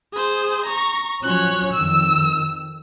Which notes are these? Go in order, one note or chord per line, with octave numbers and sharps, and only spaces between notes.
G#4 C5
A#5 C#6
F3 F#3 C#4 C#5 F#6
F2 D#3 E6